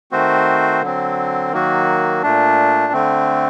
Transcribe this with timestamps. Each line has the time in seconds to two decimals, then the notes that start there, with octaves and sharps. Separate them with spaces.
0.12 D#3 A3 C4 F#4 C5
0.82 D3 F#3 C4
1.51 D#3 F#3 A#3 F#4
2.23 A#2 A3 D4
2.92 D3 A3 C4